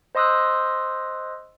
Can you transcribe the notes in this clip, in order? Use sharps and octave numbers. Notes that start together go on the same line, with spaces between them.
C5 D#5 C6 D#6 E6 F#6